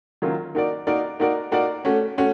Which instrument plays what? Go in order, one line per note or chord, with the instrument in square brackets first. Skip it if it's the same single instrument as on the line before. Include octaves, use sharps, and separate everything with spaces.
[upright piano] D#3 F#3 A#3 C#4 F4
A#3 D#4 F#4 A#4 D5
A#3 D#4 F#4 A#4 D5
A#3 D#4 F#4 A#4 D5
A#3 D#4 F#4 A#4 D5
A3 C#4 F#4
A3 C#4 F#4